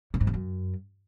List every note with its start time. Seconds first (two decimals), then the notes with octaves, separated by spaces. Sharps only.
0.14 A2
0.20 G#2
0.27 E2
0.34 F#2